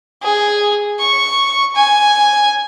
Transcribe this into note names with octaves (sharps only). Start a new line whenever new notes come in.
G#4
C#6
G#5